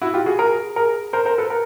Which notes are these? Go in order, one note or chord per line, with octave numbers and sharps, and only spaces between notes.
E4 F#4
F4 G4
F#4 G#4
G#4 A#4
G#4 A#4
A#4 C5
A#4 C5
A4 B4
A#4